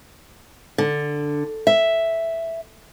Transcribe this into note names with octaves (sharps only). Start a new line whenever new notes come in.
D3
E5